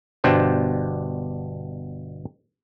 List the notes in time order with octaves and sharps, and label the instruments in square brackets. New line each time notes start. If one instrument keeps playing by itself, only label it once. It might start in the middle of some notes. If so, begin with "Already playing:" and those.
[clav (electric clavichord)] G1 B2 D4 G4 C5